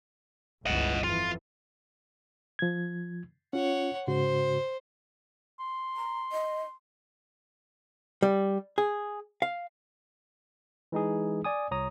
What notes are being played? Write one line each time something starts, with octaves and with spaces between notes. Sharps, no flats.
G1 C#2 E3 D#5 F#5
F2 E3 F4
F3 G#6
C#4 F4 C#5 F#5
G#2 C#3 F#4 C5
C6
A#5
D#5
G3
G#4
F5
E3 G#3 D#4 G#4
D5 G#5 D#6
C2 C#5 A#5 D#6